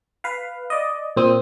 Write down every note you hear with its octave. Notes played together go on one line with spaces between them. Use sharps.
B4 F5
D5 D#5
A#2 C4 D#6